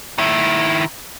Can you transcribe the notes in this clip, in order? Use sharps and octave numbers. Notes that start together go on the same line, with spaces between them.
D#3 E4